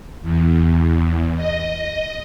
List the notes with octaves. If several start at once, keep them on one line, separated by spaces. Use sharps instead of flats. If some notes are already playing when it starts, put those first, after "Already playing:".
E2
D#5